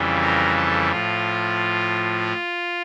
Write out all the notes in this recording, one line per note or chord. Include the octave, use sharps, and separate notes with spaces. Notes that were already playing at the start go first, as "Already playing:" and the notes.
Already playing: F2 C#3 E3 G3
A#4
A4
A2 F3 F4